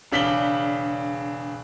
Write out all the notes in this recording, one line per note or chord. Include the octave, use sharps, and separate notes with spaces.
E1 C#3 D4 B6 F#7 G7